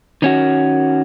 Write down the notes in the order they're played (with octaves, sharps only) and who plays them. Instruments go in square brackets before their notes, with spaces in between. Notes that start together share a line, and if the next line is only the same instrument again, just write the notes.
[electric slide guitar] D#3 C#4 F#4